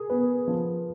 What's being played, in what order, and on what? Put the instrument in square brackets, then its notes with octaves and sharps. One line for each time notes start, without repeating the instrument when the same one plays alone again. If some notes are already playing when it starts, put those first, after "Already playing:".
Already playing: [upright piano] G#4 [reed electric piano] A#4
[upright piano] B3 [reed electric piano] B4
[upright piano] F3